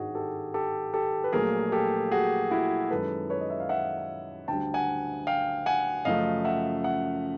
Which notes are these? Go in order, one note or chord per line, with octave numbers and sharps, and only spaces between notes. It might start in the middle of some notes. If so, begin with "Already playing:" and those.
Already playing: G#1 G2 D#3 F#4 G#4
G4 A4
G4 A4
G4 A4
B4
A#1 A#2 F#3 A3 G#4 A#4
G4 A4
F#4 G#4
E4 F#4
F#2 D#3 G#3 A4 B4
B4 C#5
D#5
E5
F5
E5 F#5
D2 D3 G3 G5 A5
F#5 G#5
F5 G5
F#5 G#5
F#2 C#3 F3 A3 D#5 F5
E5 F#5
E5 F#5